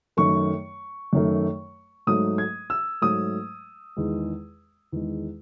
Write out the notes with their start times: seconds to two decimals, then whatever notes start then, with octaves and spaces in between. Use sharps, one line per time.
0.17 F#2 D#3 A3 C#6
1.13 F#2 D#3 A3
2.07 G#2 F#3 A3 D#6
2.38 G#6
2.70 E6
3.02 G#2 F#3 A3 D#6
3.97 E2 D#3 G#3
4.92 E2 D#3 G#3